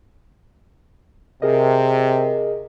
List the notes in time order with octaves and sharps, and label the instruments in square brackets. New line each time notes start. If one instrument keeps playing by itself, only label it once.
[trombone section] C3 [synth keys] G#4 A#4 D#5